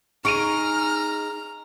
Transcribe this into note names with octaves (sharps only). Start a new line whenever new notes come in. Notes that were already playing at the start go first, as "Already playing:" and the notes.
D#4 G#4 A#5 C#6 F6 D7 D#7